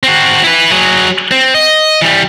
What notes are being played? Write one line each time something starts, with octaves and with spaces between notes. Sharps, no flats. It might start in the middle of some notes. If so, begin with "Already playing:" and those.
C4 F#4
E4 B4
F#3 G#4
C4
D#5
E3 G3